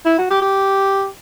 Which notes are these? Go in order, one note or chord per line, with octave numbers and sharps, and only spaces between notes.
E4
F#4
G4
G4